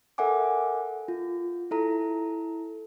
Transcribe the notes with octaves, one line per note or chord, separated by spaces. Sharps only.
A4 A#4 E5 F#5 G#5 D6
F4
E4 A4 A#5